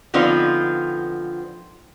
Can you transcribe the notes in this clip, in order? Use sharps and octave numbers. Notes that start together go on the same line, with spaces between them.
D3 F3 B3 C4 D#4 F4